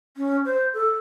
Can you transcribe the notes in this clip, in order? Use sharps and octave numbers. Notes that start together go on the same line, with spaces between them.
C#4
C5
A4